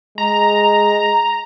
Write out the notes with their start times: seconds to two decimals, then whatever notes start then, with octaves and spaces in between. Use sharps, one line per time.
0.18 G#3 A#5